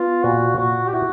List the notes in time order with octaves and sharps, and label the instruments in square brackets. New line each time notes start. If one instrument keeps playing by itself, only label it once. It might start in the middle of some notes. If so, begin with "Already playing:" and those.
Already playing: [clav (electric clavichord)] B3 [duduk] F4
[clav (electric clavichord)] A#2 [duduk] F#4
[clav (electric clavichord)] A#2 [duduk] F#4
[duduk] G4
[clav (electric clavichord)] E4 [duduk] F#4